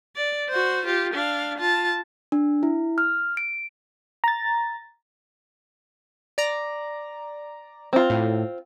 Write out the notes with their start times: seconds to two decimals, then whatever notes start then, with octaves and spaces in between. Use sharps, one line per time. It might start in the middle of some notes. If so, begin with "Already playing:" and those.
0.16 D5
0.49 F#4 C5
0.85 F4 G4
1.13 D4 F5
1.58 F4 A5
2.32 D4
2.63 E4
2.98 F6
3.37 D7
4.24 A#5 A6
6.38 D5 A#5
7.93 C4 F4
8.10 A2